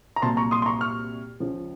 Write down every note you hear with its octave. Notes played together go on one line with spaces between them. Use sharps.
A#5
C2 A#2 F#3 A5 C6
A#5 C#6
C6 D#6
C6
A#5 C#6
C#6 F6
C#2 C#3 F3